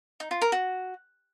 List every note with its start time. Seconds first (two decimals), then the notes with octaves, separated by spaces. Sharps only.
0.20 D#4
0.31 F4
0.41 A#4
0.52 F#4